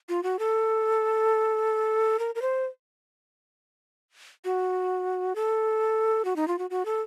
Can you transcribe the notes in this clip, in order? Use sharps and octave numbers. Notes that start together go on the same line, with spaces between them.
F4
F#4
A4
A#4
A#4
C5
F#4
A4
F#4
D#4
F4
F#4
F#4
A4